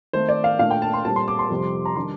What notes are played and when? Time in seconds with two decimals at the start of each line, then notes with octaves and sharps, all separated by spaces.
0.13 D#3 A3 C4 C5
0.29 D5
0.44 F5
0.59 A#2 A3 D4 F5
0.71 G5
0.82 A5
0.94 C6
1.05 A#2 G3 C4 A5
1.16 C6
1.28 D6
1.39 C6
1.50 F2 C3 G3
1.86 A#5
1.96 D#3 G3 D4 C6